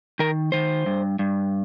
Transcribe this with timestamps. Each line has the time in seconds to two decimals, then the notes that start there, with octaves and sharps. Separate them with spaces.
0.19 D#3 A#4
0.52 D#3 C5
0.86 G2
1.19 G2